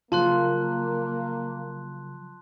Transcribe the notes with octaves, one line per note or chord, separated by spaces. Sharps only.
C#3 F3 F#3 A#3 F4 A5 C6 F#6